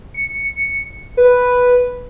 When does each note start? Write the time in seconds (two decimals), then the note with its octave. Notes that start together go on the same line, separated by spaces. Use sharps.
0.14 C#7
1.17 B4